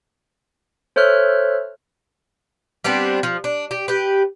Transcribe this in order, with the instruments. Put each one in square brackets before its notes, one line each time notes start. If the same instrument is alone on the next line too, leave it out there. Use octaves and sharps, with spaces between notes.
[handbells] A4 C5 C#5 E5 F6 F#6
[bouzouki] G3 B3 C4 D4
F3
D4
G4
G4 B4